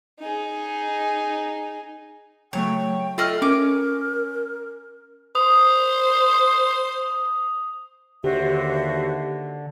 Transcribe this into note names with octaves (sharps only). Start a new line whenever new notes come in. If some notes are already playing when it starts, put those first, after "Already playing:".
D#4 G#4
C#3 F#3 A3 C#5 G5
A3 F4 D#5 E5 F6 C7
C#4 A#4 D6
C5 D#6
D#2 D3 F#4 G4 C5 E5